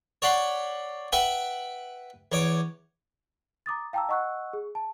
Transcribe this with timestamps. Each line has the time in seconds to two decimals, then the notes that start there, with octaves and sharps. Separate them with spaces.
0.22 C#5 D5 F#5 B5 C6
1.12 B4 E5 F#5 G5 B5
2.32 E2 C#5 D6
3.66 A#5 D6 D#6 A6
3.93 F5 G5 A5 A#5 D6 E6
4.09 D#5 F#5 C#6 E6 F#6
4.53 G#4
4.75 A5